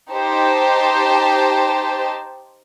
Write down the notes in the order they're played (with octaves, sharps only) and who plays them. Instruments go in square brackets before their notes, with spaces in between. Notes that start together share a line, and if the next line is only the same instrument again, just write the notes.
[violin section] D#4 G4 C5 A5